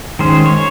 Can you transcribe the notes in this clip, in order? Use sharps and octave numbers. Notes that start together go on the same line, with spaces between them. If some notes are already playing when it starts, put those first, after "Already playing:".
D#3 G#3 C#4 C5
C#5